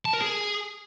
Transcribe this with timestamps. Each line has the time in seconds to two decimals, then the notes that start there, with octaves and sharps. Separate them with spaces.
0.05 A5
0.14 A#4
0.22 G#4